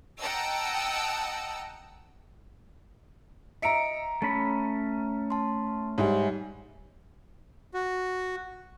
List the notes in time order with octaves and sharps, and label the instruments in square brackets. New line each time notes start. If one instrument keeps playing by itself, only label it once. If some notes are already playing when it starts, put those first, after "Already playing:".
[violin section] D#5 F#5 G5 A5 A#5 E6
[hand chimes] D#5 C#7 D7 [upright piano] E5 A#5
[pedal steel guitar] A3 C#4 B5 [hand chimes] A5
[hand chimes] A5 C6
[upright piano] G#2 G3 [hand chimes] C#5 E5 G#5
[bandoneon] F#4